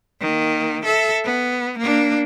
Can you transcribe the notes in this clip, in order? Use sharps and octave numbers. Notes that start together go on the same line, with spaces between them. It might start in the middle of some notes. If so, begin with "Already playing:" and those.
D#3 A#3
A4 E5
B3
A#3 D4